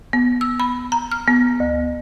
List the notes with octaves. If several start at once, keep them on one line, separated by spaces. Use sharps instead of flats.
B3
E6
B5
A#5
F6
B3
D2